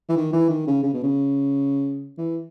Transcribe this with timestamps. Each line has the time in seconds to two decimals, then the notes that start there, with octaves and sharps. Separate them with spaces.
0.09 E3
0.17 D#3
0.33 E3
0.49 D#3
0.67 C#3
0.83 C#3
0.94 B2
1.04 C#3
2.18 E3